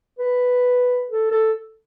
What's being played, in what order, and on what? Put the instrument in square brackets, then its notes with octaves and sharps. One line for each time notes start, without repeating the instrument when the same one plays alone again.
[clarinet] B4
A4
A4